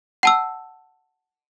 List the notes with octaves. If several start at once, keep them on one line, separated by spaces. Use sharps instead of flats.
F#5 A5 E6